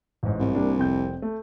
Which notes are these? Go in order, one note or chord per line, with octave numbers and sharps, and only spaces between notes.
A1 G#2
C2
G3 A#3 D4
F1 C4 G6
A3